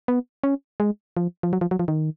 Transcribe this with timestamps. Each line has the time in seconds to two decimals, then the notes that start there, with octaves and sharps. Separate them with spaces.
0.08 B3
0.44 C#4
0.80 G#3
1.17 F3
1.43 F3
1.53 F#3
1.61 F3
1.71 F#3
1.79 F3
1.88 D#3